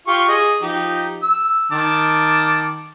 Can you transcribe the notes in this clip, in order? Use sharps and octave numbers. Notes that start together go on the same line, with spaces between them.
F4 G4 C#6
G#4 D#5
F3 D#4 G4
E6
D#3 A5 D6